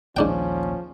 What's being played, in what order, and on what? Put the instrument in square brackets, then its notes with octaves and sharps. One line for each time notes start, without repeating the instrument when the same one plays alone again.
[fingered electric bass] A#1 D#2 [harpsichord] G#2 D4 G5 [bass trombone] F3 [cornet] C#4